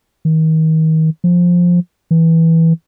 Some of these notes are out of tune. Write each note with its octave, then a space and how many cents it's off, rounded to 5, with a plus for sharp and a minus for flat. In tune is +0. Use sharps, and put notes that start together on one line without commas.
D#3 +35
F3 +10
E3 -10